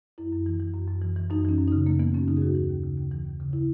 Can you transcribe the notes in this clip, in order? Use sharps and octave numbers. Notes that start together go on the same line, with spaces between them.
F#2 E4
F#2
E3
E3
F#2
F#2
E3
E3
F#2 D#4
E3 C#4
F#2
D#4
C#3
F#2 A#3
E3 B3
F#2 C#4
C#3 D#4
G#4
D#2 F#4
E3
D#2
C#3
D#2
E3
D#2
C#3
E4